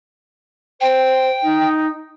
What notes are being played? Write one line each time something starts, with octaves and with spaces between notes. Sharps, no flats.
C5 G5
D#4